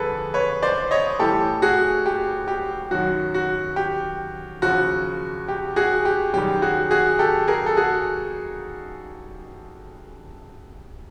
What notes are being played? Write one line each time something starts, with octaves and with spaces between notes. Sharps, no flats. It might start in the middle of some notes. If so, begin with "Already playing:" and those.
Already playing: F2 D3 G3 G#4 A4 B4
B4 C#5
C5 D5
C#5 D#5
A2 E3 G3 G4 A4
F#4 G#4
G4
G4
F#2 D#3 F#3 F#4
F#4
G4
D#2 C#3 F3 F#4
G4
F#4 G#4
G4
F#2 D#3 G3 G4
F#4 G#4
F#4 G#4
G4 A4
G#4 A#4
A4
F#4 G#4